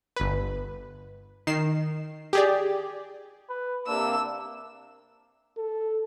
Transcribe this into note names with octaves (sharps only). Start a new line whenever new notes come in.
G1 B4
D#3 C7 E7
G4 G#4 D5
B4
C3 A#3 D4 E6
A4